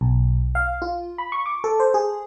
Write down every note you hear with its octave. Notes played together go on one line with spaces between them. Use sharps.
B1
F5
F4
B5
C#6
D6
A4
C5
G#4